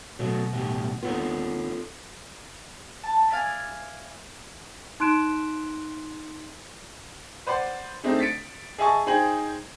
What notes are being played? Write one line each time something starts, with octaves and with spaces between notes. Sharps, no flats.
B2 F#3 A3
E2 A2 G4
D#2 B3 F4 A4 B4
A5
E4 D5 F5 G#5
D#4 C6 F#6 D7 E7
B4 C5 D5 F#5 C6
G#3 A3 C4 D4 D#4
A6 B6 C#7 D7
G#4 D#5 E5 G#5 A5 C#6
D#4 G#4 C5 G5 F#7